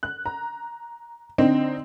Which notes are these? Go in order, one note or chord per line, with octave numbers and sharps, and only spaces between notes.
F#6
A#5
D3 C4 D#4